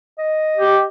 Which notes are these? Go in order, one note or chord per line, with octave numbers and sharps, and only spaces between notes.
D#5
G4